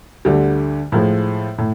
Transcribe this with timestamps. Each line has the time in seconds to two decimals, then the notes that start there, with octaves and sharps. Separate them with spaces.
0.25 D2 D3 G3
0.92 A2 F3 G#3
1.58 A2